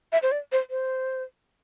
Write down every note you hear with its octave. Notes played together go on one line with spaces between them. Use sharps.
E5
C5
D5
C5
C5